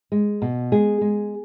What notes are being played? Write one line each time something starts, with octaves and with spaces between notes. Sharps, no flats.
G#3
B2
G#3 G#4
G#3